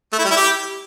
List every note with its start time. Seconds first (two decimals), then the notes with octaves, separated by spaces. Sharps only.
0.13 A3
0.19 E4
0.25 G3
0.31 E4
0.37 G4